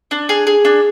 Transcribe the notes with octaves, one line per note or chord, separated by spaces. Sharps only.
D4
G#4
G#4
D4